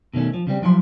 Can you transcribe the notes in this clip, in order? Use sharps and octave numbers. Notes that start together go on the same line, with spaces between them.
B2 D#3 A3 C#4
F3
C#3 G3 C4
F3 F#3 E4 F#5 C6